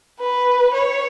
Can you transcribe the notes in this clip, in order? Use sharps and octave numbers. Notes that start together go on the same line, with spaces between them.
B4
C#5